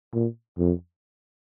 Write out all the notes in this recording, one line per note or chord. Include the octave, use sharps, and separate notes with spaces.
A#2
F2